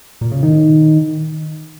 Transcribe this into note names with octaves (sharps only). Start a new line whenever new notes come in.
A#2
C#3
D#3